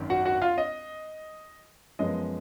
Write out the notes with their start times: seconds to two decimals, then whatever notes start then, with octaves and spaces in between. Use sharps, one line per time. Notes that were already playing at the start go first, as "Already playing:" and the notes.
Already playing: G#1 F#2 D#3
0.10 F#4 F#5
0.25 F#4 F#5
0.42 F4 F5
0.58 D#5
1.99 F#2 F3 G#3 B3 D#5